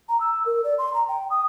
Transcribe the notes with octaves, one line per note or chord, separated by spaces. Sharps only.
A#5
E6
A#4
D5
C6
A#5
G5
D#6